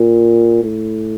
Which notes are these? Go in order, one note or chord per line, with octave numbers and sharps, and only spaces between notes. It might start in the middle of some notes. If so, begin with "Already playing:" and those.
Already playing: A#2
A2